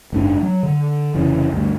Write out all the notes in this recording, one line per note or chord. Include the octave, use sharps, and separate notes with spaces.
F#1 G#2 D4
F#3
D3
F1 C#3 E3
D2 G2